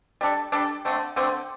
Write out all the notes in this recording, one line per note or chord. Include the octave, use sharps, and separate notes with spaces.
G3 D4 A4
G3 D4 A4
D3 A3 C4
D3 A3 C4